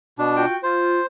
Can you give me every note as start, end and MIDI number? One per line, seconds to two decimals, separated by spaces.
0.19 0.46 47
0.19 0.46 62
0.35 0.56 65
0.35 0.56 66
0.35 0.56 79
0.63 1.00 65
0.63 1.06 72